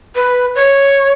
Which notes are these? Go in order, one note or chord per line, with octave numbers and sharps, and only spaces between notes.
B4
C#5